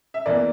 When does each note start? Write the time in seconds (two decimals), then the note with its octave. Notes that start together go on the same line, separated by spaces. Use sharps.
0.14 E5
0.26 E2 E3 A#3 D5